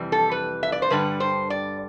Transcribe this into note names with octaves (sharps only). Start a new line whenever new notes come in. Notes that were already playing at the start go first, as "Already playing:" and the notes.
Already playing: F2 C3 E3 G3
A4
B4
E5
D5
C5
G2 D3 G3 B4
C5
D5